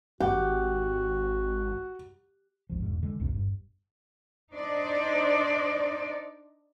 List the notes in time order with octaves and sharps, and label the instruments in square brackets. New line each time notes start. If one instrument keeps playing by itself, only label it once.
[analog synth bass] G#1 [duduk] F#4 [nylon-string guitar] G4 [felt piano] F#5
[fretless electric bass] G#1 D2 F3
E1 G#2
D3 G#3
A1 D2 G#2 C3
G1 G2
[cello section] D4 D#4 C5 D5 D#5